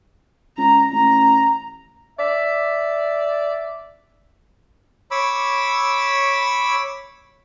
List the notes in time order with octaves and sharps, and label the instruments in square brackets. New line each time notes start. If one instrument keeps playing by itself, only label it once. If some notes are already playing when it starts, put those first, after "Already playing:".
[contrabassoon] C#2 [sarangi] A#5
[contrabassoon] A1 [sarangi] A#5
[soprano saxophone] D5 [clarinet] E5
[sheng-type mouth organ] C#5 B5 D6 E6